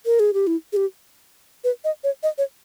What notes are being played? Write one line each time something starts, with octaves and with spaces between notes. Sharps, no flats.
A#4
G#4
G4
E4
G#4
G4
B4
D#5
C#5
D#5
C#5